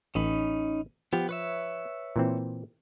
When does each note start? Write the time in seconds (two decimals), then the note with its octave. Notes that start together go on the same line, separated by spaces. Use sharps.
0.15 A1 C#4 D#4 B5
1.13 F3 B3 G4
1.29 B4 C#5 E5
2.16 A#2 E3 C4